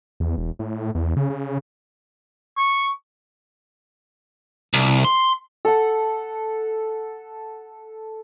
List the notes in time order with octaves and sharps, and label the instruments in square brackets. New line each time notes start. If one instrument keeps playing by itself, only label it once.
[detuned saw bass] E2
E1
A2
E2
C#3
C#3
[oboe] C#6
[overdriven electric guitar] C2
C6
[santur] A4 F#5